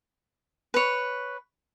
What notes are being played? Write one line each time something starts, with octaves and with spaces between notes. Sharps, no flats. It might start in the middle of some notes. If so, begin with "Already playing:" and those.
B4 C#5